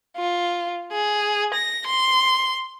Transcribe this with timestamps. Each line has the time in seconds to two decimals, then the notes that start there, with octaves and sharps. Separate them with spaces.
0.17 F4
0.92 G#4
1.54 A#6
1.87 C6